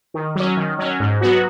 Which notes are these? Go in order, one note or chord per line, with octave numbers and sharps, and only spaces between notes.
D#3
F#3 C#4
D#3
F#3 C#4
G#2
F#3 B3 F#4